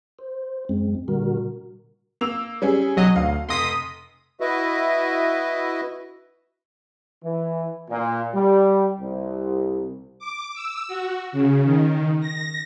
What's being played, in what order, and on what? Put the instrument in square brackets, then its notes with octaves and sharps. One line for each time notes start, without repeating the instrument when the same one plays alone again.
[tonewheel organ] C5
F#2 G#3 C4
A#2 D3 G3 F#4 A#4
[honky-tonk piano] A#3 E6 F7
G3 C#4 G#4
[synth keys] B1 F#3 D#5
[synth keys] D2 [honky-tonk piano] F5
[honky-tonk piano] F1 A#6 [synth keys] C6 D#6 B6
[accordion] E4 F#4 B4 D#5 E5
[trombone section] E3
A#2
G3
C2
[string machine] D6
E6
F#4
C#3
D#3
A#6